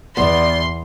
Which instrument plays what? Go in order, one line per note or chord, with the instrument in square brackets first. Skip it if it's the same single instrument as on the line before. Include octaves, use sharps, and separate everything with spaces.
[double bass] E2 [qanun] B3 [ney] D5 [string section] C6